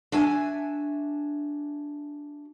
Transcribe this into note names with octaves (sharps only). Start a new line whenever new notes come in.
D4 F#4 E5 G#5